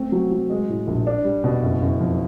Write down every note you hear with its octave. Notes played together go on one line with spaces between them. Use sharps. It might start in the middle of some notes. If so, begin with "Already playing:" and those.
Already playing: A3 C4
F#3
F#3
G#3
A2
A#1
D4
G3
B2
F#1
F#1
F2